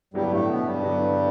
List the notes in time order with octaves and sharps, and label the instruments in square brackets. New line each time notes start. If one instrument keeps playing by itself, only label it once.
[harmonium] G2 G3 [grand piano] D3 F#3 B3 E4 G4
[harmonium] A2 A3
B2 B3
G2 G3
[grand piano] D3 F#3 B3 E4 G4